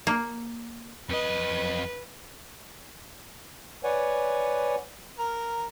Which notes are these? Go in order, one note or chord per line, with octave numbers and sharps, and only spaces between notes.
A#3
F2 B4 D#5
B4 C#5 D5 F#5 G#5
A#4